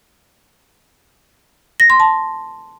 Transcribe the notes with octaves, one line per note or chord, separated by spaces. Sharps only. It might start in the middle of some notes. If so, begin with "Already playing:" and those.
A#6
C6
A5